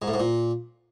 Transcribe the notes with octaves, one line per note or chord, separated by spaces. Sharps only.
G#2
A2
G#2
A#2